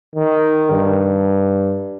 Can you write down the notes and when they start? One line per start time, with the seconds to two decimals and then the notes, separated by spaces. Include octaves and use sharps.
0.16 D#3
0.70 G2